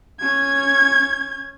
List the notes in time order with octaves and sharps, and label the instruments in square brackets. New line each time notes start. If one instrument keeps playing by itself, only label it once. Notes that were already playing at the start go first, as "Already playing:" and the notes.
[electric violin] C#4 G#6